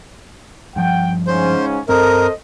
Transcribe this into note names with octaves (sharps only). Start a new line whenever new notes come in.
G2 F3 F#5 G5
G#2 C#3 C#4 C5
G2 C4 A4 A#4 C5 D#5